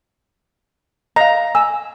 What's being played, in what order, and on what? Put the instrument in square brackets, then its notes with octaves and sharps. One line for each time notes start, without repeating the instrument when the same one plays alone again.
[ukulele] D#5 F5 [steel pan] A#5
[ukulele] G#5 [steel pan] E6